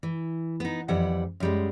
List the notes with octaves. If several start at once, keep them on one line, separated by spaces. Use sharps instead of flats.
E3
B3 D#4
F2 E3 G3 F#5
F#2 G3 G#3